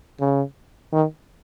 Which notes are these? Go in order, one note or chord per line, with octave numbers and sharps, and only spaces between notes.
C#3
D#3